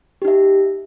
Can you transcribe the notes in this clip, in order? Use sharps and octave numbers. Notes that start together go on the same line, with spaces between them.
D#4 G4 E5